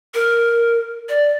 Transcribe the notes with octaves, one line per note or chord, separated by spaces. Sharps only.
A#4
D5